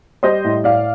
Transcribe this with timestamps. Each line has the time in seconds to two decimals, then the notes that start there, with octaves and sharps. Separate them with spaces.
0.23 G3 C5 D#5
0.44 A2
0.64 A2 D5 F5